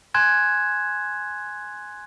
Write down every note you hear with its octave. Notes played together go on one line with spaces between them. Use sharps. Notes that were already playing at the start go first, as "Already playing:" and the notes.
G#5 C6 F#6 G#6 E7